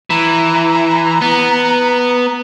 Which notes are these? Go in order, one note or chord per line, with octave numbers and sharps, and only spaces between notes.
E3 A#5
B3